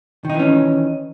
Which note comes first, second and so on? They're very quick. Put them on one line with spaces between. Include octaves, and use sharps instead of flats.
D#3 D#4 E3 C#4